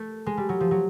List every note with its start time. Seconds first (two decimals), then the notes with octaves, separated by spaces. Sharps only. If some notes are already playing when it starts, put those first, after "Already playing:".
Already playing: A3
0.26 G#3
0.37 G3
0.49 F#3
0.60 F3
0.71 F#3